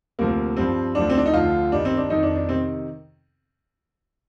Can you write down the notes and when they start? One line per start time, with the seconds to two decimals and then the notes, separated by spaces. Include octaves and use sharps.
0.19 D2 C3 F3 A#3
0.57 G2 F3 C4
0.95 D2 D3 F3 D4
1.10 C4
1.18 D4
1.26 D#4
1.34 D2 D3 F3 F4
1.72 G2 D#3 D4
1.85 C4
1.97 D4
2.10 F2 D#3 D#4
2.23 D4
2.36 D4
2.49 C3 D#3 C4